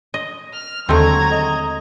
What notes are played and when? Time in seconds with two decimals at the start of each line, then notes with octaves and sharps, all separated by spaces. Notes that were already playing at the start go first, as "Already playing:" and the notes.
0.14 D#5
0.53 F6
0.89 D#2 D3 F#3 G#3 A3 C4 A#5 G#6
1.31 D#5